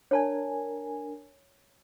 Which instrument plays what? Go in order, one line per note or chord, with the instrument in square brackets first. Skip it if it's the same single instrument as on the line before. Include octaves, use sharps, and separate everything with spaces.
[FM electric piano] D4 A#4 G#5 [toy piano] C#5 A5